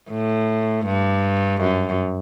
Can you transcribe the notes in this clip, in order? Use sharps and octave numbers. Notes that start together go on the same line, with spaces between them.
A2
G2
F#2